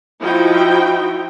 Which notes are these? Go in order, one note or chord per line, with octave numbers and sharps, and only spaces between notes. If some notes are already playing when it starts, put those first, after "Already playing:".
F3 D#4 E4 F#4 G5